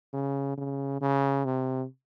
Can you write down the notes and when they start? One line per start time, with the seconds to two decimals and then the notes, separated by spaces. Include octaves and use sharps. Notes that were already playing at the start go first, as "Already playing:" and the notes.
0.13 C#3
0.57 C#3
1.01 C#3
1.45 C3